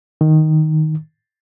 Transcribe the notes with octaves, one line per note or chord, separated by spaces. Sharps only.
D#3